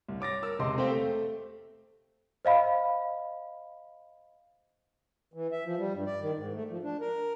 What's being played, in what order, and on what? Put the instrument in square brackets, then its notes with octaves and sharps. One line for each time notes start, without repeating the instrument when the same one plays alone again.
[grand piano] C2
C#5 D6 A6 A#6
A#4 E6
E1 C3 D#5 C6 D6
A3 C4 G4 C5 F5 G5
A3
[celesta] C5 D#5 F5 B5
[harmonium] E3
E5
F3
G3
G2
D5
D#3
G#2
A3
F3
D4
A#4